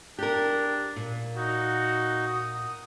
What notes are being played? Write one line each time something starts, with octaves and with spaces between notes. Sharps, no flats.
D4 G4 A#4
A#2
D#4 F#4
D#6